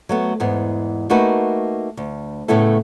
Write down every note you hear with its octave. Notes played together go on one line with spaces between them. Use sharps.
F#3 A3 B3
E2 G#2 B3
A3 A#3 D#4 F#4 A#4 B4
D2
A2 C#3 A3 B3 E4 A4